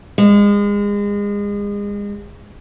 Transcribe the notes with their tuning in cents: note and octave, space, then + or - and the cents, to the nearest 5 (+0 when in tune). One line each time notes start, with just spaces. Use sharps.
G#3 -30